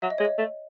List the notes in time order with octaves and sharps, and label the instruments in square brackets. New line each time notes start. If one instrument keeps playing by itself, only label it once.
[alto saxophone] F#3 [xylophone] E5
[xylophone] D#5
[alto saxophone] G#3 [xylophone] C#5
[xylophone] D#5
[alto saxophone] A3